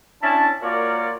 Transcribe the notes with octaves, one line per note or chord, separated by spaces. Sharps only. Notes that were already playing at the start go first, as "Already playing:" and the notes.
C#4 D4 E4 A5
A#3 F4 F#4 A#4 C#5 D5